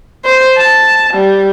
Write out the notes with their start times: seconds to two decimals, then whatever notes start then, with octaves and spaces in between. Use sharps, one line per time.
0.24 C5
0.58 A5
1.13 G3